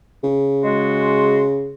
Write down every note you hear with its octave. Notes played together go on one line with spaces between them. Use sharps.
C#3
G#3 F#4 C6